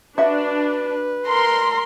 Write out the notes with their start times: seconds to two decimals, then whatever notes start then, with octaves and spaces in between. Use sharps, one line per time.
0.18 D4 F#4 B4 E5
1.28 A#4 C6